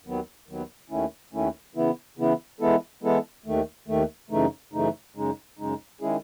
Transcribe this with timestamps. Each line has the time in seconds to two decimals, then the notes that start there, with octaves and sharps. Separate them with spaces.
0.05 D#2 D#3 F#3 B3
0.48 D#2 D#3 F#3 B3
0.90 D#2 D#3 A3 C#4 E4
1.33 D#2 D#3 A3 C#4 E4
1.75 C#3 E3 B3 E4
2.18 C#3 E3 B3 E4
2.61 E3 G#3 B3 E4 A4
3.03 E3 G#3 B3 E4 A4
3.46 D#2 D#3 A3
3.88 D#2 D#3 A3
4.31 F#2 C#3 E3 A3 D#4
4.73 F#2 C#3 E3 A3 D#4
5.16 F#2 C#3 G#3 D#4
5.59 F#2 C#3 G#3 D#4
6.01 D#3 G#3 C#4 E4 G#4